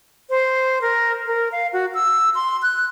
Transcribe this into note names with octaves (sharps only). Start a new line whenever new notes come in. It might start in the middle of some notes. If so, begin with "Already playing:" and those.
C5
A#4
A#4
F5
F#4
E6
C6
F#6